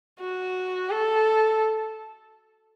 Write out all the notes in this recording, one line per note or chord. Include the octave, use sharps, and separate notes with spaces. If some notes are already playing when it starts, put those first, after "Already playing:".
F#4
A4